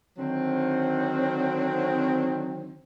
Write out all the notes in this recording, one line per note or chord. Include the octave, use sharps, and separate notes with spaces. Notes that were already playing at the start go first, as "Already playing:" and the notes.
D3 D#3 F#3 C4